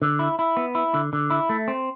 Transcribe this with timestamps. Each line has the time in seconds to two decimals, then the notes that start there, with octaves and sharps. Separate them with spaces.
0.02 D3
0.19 E4
0.39 E4
0.57 B3
0.75 E4
0.94 D3
1.13 D3
1.30 E4
1.49 A3
1.68 C4